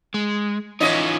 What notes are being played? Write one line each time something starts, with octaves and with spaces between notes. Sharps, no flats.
G#3
E3 C#4 D#4 F4 C#5 D#5